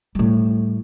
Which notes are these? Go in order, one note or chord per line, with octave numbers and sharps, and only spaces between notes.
A2 G3